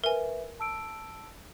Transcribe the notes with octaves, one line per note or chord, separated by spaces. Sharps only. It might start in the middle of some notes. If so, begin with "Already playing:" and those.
A#4 B4 E5 G#5
A5 E6 D7